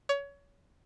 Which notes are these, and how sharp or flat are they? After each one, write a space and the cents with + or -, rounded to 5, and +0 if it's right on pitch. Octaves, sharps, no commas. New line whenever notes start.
C#5 +25